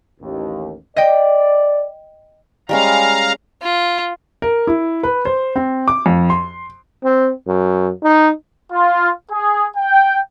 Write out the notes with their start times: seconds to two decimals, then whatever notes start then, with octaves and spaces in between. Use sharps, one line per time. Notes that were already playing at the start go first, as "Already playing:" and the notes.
0.20 A1 D#2
0.96 D5 D#5 G5
2.69 G3 G#3 C#4 F5 A#5
3.62 F4
4.42 A#4
4.67 E4
5.03 B4
5.25 C5
5.56 C4
5.88 D6
6.06 F2
6.30 C6
7.04 C4
7.47 F#2
8.03 D#4
8.73 F4
9.31 G#4
9.77 G5